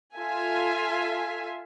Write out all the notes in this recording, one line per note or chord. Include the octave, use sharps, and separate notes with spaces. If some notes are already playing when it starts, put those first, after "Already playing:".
F4 A4 E5 G#5